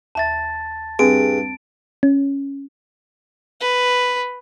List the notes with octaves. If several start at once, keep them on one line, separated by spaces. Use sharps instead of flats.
D#2 E5 A5 A6
G2 C4 G#4 D7
C#4
B4